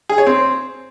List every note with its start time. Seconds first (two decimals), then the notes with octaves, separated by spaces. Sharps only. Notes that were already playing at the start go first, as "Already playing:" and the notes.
0.09 G#4
0.18 C#5
0.27 C4